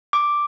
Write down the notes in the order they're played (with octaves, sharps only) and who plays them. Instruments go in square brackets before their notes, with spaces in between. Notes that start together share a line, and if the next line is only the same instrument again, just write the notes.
[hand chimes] D6